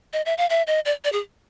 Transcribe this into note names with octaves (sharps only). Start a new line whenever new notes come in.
D#5
E5
F5
E5
D#5
D5
D5
G#4